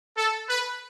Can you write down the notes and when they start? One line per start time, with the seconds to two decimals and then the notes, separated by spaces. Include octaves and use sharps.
0.17 A4
0.49 B4